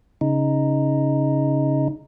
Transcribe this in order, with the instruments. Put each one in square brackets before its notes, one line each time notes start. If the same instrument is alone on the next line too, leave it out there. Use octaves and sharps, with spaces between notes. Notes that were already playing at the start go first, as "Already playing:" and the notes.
[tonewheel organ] C#3 D#4